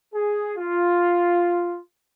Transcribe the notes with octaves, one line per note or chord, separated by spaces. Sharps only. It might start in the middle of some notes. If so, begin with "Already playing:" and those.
G#4
F4